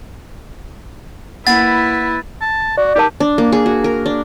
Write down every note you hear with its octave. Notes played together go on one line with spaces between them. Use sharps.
A#3 E4 B4 F#5 A6
A5
F#4 D5
D#4 G4 A#4 A5
D4
A#3
G#4
F#4
A#4
D4